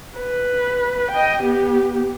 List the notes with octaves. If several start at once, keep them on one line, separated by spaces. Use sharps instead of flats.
B4
D#5 G5
B3 G4